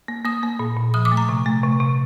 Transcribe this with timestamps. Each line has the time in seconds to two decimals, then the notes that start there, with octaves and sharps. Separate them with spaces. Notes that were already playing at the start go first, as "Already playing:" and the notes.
0.08 A#3
0.25 A#3 D#6
0.43 A#3
0.59 A#2
0.76 A#2
0.94 F3 D#6
1.05 D6
1.12 A3
1.17 A#5
1.29 C3
1.46 A3
1.63 C3
1.80 C3